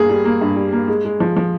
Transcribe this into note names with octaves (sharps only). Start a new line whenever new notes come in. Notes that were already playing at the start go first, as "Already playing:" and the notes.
Already playing: G2 A#3 G#4
G3
A#3
G2
G3
A#3
G#3
G#3
F3
F3